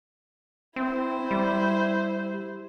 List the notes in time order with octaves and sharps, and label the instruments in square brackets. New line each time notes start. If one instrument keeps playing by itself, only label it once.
[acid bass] C4 [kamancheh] E4 C5
[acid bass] G3